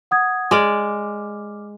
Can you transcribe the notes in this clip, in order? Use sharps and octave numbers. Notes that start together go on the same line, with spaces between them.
F#5 D#6 G#6
G#3 D5 D6 F6